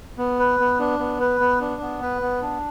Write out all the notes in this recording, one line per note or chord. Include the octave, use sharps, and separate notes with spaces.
B3
B4
B3
D4
B3
B4
B3
D4
B3
B4
B3
D4